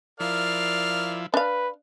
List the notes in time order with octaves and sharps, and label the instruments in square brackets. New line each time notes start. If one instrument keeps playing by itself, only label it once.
[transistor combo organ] F3 E4 [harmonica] A#4 D5 F5
[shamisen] D4 F5 [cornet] B4